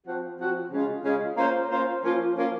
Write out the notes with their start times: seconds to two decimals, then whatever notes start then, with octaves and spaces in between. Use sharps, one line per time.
0.07 F3 C4 F#4
0.39 F3 C4 F#4
0.72 C#3 G#3 C#4 F4
1.04 C#3 G#3 C#4 F4
1.37 A#3 C#4 F4 C5
1.70 A#3 C#4 F4 C5
2.03 F3 A#3 C#4 F4
2.36 F3 A#3 C#4 F4